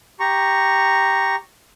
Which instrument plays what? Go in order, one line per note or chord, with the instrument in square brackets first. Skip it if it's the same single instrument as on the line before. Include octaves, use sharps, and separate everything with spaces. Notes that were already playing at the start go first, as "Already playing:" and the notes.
[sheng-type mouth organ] G4 A#5 C#6